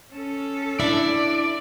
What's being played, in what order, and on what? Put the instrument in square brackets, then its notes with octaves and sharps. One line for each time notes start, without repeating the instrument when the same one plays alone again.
[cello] C#4 A4
[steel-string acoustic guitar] D4 E4 E5 [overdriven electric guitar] D5